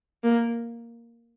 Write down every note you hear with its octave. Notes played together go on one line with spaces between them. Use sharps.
A#3